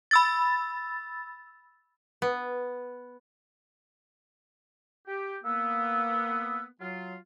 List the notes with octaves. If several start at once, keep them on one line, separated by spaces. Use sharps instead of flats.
B5 E6 A6
B3
G4
A#3 B3 E6
F#3 F4